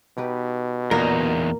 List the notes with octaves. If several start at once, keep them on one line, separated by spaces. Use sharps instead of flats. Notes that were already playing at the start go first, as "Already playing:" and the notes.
B2 D#4 G4 B4
E2 A#2 A#3 D#4 A#4